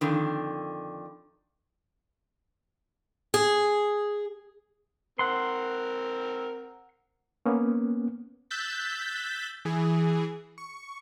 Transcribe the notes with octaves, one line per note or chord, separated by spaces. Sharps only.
F2 D3 D#3
G#4
C4 A#4 F#5 C6
A#3 B3 C#4
E6 F#6 G6 A6 B6
E3 G#4
C#6